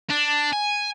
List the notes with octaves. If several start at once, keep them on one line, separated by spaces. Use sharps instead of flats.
D4
G#5